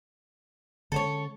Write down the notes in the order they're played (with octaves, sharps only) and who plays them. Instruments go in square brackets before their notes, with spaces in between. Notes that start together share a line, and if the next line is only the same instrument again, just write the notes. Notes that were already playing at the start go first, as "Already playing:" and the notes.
[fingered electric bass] D3 G#3 C#4 [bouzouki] A4 C5 C#5